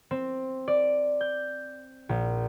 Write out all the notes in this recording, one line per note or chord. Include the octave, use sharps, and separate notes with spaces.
C4
D5
G6
A#1